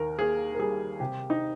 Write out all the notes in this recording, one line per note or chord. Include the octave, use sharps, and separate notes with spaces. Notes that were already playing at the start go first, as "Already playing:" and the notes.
Already playing: D#2 A#4
A#3 G#4
A#4
G3 G#4
C3 G4
D#4